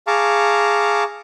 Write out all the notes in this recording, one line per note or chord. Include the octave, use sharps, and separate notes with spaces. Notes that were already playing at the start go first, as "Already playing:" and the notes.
G#4 F5 A5 A#5 C#6 D6